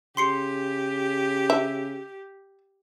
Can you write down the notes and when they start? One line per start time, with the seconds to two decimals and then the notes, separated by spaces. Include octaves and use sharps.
0.17 C#3 G4 C6 C7 C#7
1.50 E5